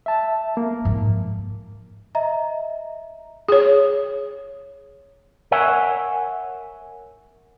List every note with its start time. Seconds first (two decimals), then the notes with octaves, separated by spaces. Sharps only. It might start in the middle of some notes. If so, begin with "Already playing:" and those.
0.06 E5 A5
0.57 A#3
0.85 G#2 F3
2.15 D#5 E5 A#5
3.49 G#4 C#5
5.51 A#4 C#5 E5 F#5 G#5